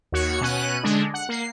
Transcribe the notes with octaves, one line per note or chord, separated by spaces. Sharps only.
D#2 F#4 C#5 C#7
B2 C#4 F#6 D#7
D3 G#3 D4
F#5
A#3 C7